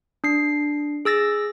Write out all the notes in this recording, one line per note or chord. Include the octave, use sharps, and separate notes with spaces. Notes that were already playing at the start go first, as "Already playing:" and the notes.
D4 C7
G#4 E6 A6 A#6